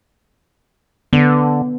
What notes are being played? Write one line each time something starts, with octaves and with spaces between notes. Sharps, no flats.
D3 B3